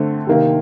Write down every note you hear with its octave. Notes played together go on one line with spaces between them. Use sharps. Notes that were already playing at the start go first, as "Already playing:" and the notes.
Already playing: D3 A3 C4
C3 D#3 A#3